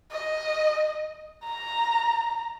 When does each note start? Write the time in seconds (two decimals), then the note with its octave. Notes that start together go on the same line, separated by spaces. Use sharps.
0.11 D#5
1.44 A#5